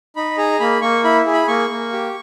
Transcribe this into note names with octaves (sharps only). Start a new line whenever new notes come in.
D#4 B5
G#4 A#5
A#3 B5
A#3 C#6
E4 B5
G#4
B5
A#3 C#6
A#3
G4